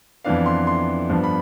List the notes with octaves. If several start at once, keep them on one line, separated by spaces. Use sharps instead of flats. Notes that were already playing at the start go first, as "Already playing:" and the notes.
F2 E3 B3 D4 F5
C6
C6
G2 F3 B3 D4
B5